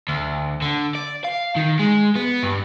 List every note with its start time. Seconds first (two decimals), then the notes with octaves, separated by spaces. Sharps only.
0.08 D2
0.62 D3
0.95 D5
1.25 F5
1.57 D#3
1.79 G#3
2.16 B3
2.43 G2